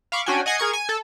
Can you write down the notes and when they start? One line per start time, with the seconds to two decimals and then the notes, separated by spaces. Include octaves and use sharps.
0.12 F5 B5 C#6 D6
0.26 C#4 D4 F#4 G5 G#5
0.46 D#5 F#5 G#5 G#6 C7 C#7
0.58 G#4 A#4 C#6 G#6
0.73 G#5
0.89 A4